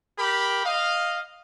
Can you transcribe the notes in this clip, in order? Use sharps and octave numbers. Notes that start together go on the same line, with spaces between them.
G4 A#4 B5
D#5 F5